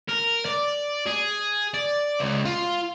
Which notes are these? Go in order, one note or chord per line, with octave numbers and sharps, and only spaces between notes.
A#4
D5
G#4
D5
C#2
F4